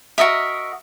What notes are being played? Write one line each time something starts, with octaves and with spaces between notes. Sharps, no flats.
F#4 A#4 D#5 E5